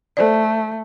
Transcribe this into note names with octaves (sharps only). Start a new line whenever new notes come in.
A3 A4 C5 D5